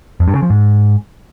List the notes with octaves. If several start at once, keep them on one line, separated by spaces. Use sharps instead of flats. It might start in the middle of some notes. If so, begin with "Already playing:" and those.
F2
G2
C#3
F3
G#2